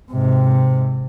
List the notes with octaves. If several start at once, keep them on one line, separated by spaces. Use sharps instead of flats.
G#2 C3